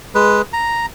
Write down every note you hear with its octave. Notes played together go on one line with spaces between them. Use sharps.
G#3 B4
A#5